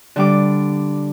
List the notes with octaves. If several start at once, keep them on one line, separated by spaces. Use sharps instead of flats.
D3 G3 D6